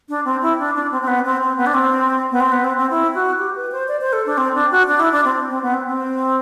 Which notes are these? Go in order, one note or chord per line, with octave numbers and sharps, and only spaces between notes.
D4
C4
E4
D4
D4
C4
C4
B3
C4
C4
B3
D4
C4
B3
C4
B3
C4
C4
E4
F#4
G4
B4
C5
D5
C5
A4
D4
C4
D4
F#4
D4
E4
D4
C4
C4
B3
C4
C4